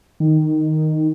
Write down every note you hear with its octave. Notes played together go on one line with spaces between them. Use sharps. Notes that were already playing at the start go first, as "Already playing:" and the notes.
D#3